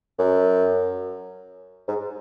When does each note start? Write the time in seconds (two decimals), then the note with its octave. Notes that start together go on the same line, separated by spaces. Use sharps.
0.19 F#2
1.88 G#2